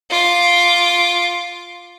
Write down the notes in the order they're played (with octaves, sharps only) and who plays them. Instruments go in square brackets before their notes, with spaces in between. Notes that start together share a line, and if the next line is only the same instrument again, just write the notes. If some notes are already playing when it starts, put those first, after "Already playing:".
[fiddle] F4 D6